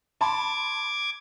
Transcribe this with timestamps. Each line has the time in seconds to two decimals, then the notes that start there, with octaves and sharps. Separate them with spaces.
0.21 A5 B5 C6 D6 G#6